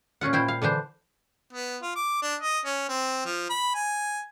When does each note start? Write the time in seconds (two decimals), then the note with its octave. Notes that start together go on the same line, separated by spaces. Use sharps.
0.21 A#2 C#4 F4 F#5
0.33 A#2 E4 C5 G5
0.48 F5
0.62 D3 E3 D4 C5
1.53 B3
1.82 F4
1.96 D6
2.22 D4
2.41 D#5
2.66 C#4
2.89 C4
3.25 F3
3.50 B5
3.75 G#5